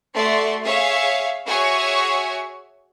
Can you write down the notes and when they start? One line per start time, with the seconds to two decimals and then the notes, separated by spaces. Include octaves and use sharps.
0.13 A3 F#4 D5 C6 C#6
0.64 G#4 C#5 E5 F5
1.47 F#4 G#4 C#5 E5 G#5 C#6